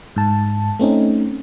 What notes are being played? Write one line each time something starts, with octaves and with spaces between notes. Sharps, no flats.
G#2 A5
A3 C4 C#4 D#4